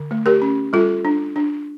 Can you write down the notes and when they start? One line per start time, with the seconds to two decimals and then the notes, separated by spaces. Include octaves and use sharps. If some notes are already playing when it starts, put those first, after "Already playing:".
Already playing: D3
0.11 A3
0.26 G4 A#4
0.42 C#4
0.73 G3 F4 A4
1.05 D4
1.36 D4